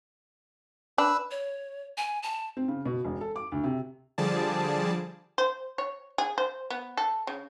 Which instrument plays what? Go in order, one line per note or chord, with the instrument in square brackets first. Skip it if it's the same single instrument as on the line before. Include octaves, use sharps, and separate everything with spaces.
[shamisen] D4 [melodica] B4 E6
[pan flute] C#5
G#5
A5
[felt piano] C4
C#3
B2
E1
A4
D6
D2
C3
[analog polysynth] D3 F3 G3 G#4 D5 A5
[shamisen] C5
C#5
G#4
C5
B3
A4
C#3